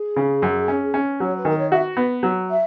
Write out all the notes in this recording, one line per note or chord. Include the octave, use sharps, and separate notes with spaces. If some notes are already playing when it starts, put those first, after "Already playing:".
Already playing: G#4
C#3
F#2
C#4
C#4
F#3 C#5
B4
D#3 A#4
C#5
F#4 E5
B3
F#3
E5